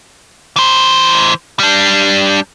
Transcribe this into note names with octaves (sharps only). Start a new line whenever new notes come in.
E3 C5
G3 D4